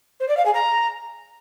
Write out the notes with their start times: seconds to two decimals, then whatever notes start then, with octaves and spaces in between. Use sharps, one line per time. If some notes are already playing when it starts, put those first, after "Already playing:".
0.20 C5
0.29 D5
0.37 F5
0.46 G#4
0.54 A#5